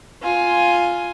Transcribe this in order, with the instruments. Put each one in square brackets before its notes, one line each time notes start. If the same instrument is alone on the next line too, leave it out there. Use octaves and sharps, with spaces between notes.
[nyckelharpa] F4 G#5